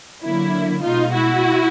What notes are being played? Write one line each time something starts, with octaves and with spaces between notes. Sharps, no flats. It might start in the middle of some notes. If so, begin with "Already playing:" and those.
D3 F#3 A#3 E4
B2 G#3 D#4 F4
E4 F#4